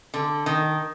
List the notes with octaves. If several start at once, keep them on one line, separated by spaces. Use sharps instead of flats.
D3
D#3